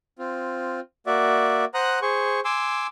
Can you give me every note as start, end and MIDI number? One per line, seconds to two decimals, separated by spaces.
0.19 0.80 60
0.19 0.80 65
1.07 1.65 58
1.07 1.65 66
1.07 1.65 74
1.07 1.65 76
1.74 1.99 72
1.74 1.99 78
1.74 1.99 82
1.74 1.99 87
1.74 1.99 90
2.02 2.40 68
2.02 2.40 72
2.02 2.40 85
2.45 2.87 80
2.45 2.87 84
2.45 2.87 86
2.45 2.87 88